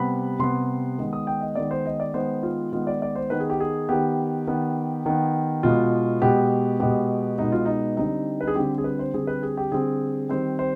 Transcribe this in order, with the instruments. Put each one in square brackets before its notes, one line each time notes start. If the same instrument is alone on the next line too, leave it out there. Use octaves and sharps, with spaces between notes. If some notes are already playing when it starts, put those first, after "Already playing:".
Already playing: [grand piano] C3 G3 B3 B5
C3 G3 B3 C6
D#3 G#3 B3
D#6
G5
D#5
D#3 G#3 B3 D5
C5
D#5
D5
D#3 G#3 B3 C5
F4
D#3 G#3 B3 F4
D5
D5
C5
D#3 B3 B4
G#4
G4
G#4
D#3 B3 G4
D#3 B3
D#3 B3
B2 G#3 B3 F4
B2 G#3 B3 G4
B2 G#3 B3 G4
B2 G#3 B3 D#4
F4
D#4
D3 G3 C4 D#4
B4
G#4
D3 G3 C4 G4
G#4
B4
C5
D3 G3 C4 G#4
B4
G#4
G4
D3 G3 C4 G#4
D#3 G3 C4 C5
C5